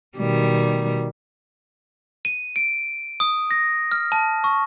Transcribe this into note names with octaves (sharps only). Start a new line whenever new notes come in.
B2 D#3 G3
D#7
D7
D#6
A#6
F6
A5
C#6